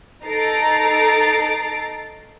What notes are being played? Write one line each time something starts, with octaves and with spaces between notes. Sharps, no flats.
D#4 A4 A#5 A6 C7 D7